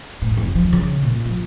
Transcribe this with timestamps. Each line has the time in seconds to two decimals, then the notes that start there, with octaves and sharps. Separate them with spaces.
0.22 A2
0.37 F1
0.55 F3
0.73 C#3
1.03 A#2
1.25 F3